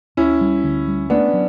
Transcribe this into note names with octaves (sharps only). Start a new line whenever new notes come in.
D2 C#4 E4
G3
D2
G3
A3 B3 D4
F#3